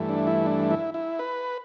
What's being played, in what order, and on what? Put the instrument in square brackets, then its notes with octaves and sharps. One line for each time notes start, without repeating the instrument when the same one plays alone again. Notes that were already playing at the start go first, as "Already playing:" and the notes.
Already playing: [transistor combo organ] G2 E3 A3
D4
E4
D4
E4
E4
B4